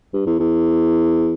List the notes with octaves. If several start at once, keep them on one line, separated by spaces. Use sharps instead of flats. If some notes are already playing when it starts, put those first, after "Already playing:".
G2
E2
E2